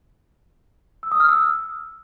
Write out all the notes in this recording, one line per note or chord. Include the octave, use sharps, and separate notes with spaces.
E6
D#6
F6
E6